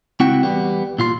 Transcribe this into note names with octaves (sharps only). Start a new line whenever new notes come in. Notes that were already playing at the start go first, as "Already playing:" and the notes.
C#2 C4 E4 F#4 F#5 G5
E2 G3 B3
A#2 F4 C6